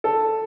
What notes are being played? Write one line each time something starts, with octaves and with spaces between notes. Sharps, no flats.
A4